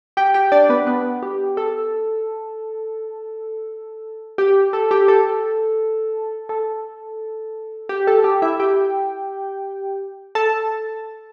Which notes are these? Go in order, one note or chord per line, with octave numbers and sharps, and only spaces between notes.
G4 G5
G4 G5
D4 D5
B3 B4
B3 B4
G4
A4
G4
A4
G4
A4
A4
G4
A4
G4
E4 E5
G4 G5
A4 A5